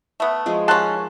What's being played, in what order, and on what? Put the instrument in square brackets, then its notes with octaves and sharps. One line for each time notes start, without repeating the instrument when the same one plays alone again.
[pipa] A3 B3
[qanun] F3 G#3 G#4
[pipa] D#3 C#4 [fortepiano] A5 C6 F#6